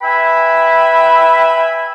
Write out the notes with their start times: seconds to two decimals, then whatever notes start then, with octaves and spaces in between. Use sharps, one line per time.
0.02 B4 E5 G5 G#5 B5